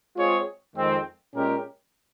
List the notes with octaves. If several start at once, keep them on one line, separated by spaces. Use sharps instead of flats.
G#3 C4 F4 G#4 C#5
F2 D#3 G#3 C4
A#2 G#3 C#4 G4 A#4